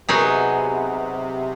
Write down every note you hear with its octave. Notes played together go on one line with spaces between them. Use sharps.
C3 F#3 B3 D#4 G#4